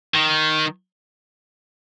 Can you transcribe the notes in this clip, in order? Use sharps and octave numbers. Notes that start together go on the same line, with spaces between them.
D#3